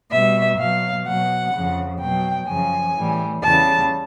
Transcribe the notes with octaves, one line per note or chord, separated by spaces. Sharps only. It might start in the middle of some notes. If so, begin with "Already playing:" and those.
B2 G3 E5
B2 F#3 F5
B2 F#3 F#5
F2 C#3 F3
B2 F#3 G5
F#2 C#3 F3 G#5
A2 E3 G3
E2 C#3 E3 G3 A5